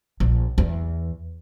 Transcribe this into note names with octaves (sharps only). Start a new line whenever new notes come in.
A#1
E2